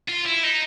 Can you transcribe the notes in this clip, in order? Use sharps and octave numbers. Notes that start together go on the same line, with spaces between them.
F4
E4
D#4